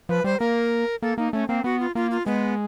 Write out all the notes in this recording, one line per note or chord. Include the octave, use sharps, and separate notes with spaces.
F3 B4
G3 C5
A#3 A#4
A#3 A4
A#3 D#4
A3 C#4
A#3 C4
B3 F#4
F4
A#3 F4
F4
G#3 B3